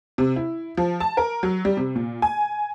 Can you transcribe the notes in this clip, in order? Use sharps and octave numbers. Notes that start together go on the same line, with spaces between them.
C3
E4
F3
A5
A#4
F#3
G3
C3
A#2
G#5